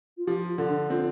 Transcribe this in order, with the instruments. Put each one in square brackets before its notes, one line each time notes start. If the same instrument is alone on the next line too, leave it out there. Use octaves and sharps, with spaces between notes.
[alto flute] F4
[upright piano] F3 [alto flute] G4
[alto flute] F4
[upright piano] D3
[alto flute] D4
[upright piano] C4 [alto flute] F4